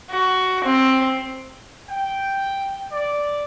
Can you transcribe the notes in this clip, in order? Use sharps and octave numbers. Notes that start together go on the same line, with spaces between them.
F#4
C4
G5
D5